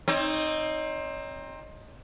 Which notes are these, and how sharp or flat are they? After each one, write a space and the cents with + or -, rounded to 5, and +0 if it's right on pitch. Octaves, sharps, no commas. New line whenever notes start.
C4 +20 D#4 +0 C#5 +25